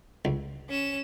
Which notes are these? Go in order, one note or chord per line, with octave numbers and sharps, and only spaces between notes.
C#2
C#4 E7